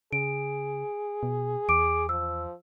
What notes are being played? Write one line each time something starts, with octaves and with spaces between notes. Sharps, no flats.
C#3 G#4 D7
B2
E2 D6 D7
F3 E6